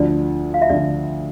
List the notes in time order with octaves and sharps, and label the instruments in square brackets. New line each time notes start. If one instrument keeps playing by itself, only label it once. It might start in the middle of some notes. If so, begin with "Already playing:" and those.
Already playing: [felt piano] D2 D3 F3 [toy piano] D5
[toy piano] F5
E5
[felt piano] D2 D3 F3 [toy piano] D5